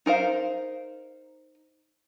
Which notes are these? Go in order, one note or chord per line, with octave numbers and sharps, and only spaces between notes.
D#4 A#4 C5 F5